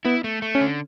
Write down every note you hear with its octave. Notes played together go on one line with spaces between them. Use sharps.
B3 E4
A3
A3
C#4
D3